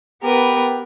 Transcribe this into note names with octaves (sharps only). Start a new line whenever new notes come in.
B3 G4 A#4 B4